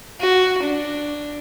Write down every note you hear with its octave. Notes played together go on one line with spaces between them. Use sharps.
F#4
D4